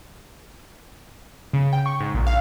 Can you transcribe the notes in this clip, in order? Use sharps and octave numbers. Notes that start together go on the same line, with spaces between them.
C#3
G5
C#6
G#2
A#1
F5